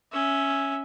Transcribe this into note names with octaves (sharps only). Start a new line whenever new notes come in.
C#4 E5